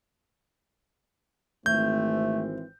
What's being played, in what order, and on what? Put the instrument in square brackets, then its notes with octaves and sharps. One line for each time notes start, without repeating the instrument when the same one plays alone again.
[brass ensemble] G#1 E3 C4 [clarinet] A3 [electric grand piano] G6